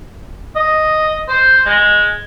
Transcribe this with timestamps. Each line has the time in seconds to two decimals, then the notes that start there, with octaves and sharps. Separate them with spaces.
0.56 D#5
1.29 C5
1.66 G#3